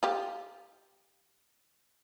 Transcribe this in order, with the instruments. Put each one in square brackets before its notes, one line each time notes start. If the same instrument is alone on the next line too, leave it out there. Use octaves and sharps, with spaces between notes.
[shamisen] F4 G4